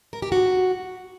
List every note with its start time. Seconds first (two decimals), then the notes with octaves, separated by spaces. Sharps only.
0.13 A#4
0.22 G4
0.32 F#4